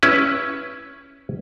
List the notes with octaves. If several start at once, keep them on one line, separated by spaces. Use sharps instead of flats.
C#4 E4 B4